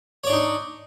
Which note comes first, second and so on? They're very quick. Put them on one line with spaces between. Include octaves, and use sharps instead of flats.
C#5 D5 D4 D#4